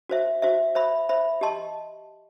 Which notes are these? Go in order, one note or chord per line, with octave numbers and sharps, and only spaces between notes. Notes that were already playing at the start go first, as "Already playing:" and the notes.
F#4 C5 E5
F#4 C5 E5
C5 E5 B5
C5 E5 B5
G4 D#5 A5 C6